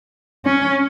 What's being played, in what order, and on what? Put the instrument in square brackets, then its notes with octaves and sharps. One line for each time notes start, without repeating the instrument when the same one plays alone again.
[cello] C#4